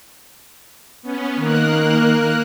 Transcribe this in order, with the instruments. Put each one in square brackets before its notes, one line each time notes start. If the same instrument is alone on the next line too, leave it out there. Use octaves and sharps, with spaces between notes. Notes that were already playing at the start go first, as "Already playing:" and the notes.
[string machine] B3 C#4
[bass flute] D#3 [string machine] A#3 A#4 F#6